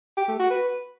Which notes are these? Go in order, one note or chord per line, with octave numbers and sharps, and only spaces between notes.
G4
A3
F#4
B4